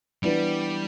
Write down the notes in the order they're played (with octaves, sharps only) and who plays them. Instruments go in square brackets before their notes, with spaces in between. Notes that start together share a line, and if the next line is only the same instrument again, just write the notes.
[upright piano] E3 B3 D4 [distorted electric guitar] G3